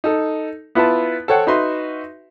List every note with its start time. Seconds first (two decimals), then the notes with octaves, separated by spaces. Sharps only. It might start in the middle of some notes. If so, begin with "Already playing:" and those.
0.04 D#4 A4
0.75 B3 E4 F4 B4 A5
1.28 A4 C5 C#5 F#5 G5
1.47 D#4 F#4 B4 E5 C6